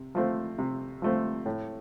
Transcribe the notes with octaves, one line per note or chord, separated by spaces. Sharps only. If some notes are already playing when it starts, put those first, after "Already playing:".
Already playing: C3
F3 A3 C4
C3
F3 A3 C4
A2